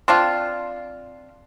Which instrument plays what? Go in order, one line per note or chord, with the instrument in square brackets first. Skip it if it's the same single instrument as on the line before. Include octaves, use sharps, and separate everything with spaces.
[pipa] C4 D4 F4